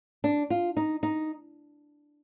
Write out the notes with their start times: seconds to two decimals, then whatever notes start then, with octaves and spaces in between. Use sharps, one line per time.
0.24 D4
0.50 F4
0.77 D#4
1.03 D#4